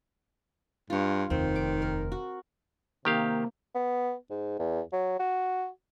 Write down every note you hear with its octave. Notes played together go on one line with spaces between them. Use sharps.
G2 F4 C#5
F1 D#2 D#3 C4
D6
A#4
F#4
C3 D#3 A#3 G4 F5
B3
G#2
E2
F#3
F#4